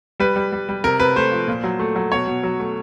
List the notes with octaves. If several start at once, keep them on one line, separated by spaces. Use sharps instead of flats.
G3 B4
G3
G3
G3
C3 A#4
C3 B4
A3 C5
F3
A#2
F#3
A3
F#3
B2 C#5
B2
F#3
A3